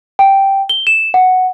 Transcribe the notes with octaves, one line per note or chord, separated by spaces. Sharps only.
G5
G7
E7
F#5